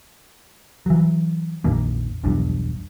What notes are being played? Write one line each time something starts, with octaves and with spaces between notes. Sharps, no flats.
E3 F#3
A#1 F2 D#3 A#3
F1 B1 E2 G2